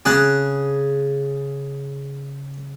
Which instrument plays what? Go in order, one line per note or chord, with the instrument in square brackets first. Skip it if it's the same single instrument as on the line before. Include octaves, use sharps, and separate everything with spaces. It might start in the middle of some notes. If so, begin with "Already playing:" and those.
[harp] C#3 F#6 [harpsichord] G#4 A5